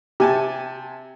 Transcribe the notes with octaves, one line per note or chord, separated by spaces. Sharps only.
C3 G4 G#5 A5